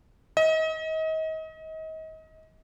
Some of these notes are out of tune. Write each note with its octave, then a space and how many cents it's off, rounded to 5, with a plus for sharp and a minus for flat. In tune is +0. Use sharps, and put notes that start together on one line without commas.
D#5 +35